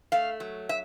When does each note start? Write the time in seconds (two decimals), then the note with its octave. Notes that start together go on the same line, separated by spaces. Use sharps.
0.12 A3 F5
0.40 F#3
0.69 E5